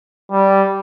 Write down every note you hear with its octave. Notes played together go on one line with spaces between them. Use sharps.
G3